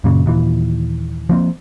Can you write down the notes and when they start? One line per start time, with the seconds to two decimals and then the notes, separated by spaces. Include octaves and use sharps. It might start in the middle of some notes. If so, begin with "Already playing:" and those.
0.04 F#2 A#2 C#3
0.26 D#2 A#2 E3
1.29 F3 A#3 C4